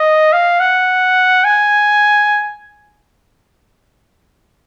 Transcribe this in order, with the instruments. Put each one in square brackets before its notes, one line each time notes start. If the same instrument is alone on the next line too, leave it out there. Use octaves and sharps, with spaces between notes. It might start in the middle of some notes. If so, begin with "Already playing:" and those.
Already playing: [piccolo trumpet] D#5
F5
F#5
G#5